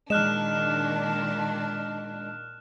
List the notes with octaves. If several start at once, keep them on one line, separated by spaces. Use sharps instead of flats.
A#2 D#3 G#3 D4 D#5 F6 F#6 E7